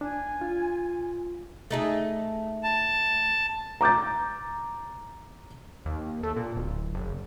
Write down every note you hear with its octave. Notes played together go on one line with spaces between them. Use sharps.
D4 G#5
F4
A3 D#4 G#4
A5
A#5 D6 G6 A6
D#2
A3
A#2
D1
F#1